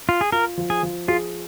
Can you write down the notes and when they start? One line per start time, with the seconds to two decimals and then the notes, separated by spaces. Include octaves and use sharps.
0.09 F4
0.21 G#4
0.32 F4 A#4
0.57 F3
0.70 G#4
0.83 F3
1.08 F4 G#4